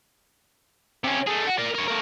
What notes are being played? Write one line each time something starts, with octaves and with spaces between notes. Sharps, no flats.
C3 C#4
A3 G#4
F#4
A#4 D5
A#4 C#5
A3 A#4